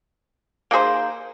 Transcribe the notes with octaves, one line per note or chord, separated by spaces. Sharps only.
A#3 D#4 G#4 C5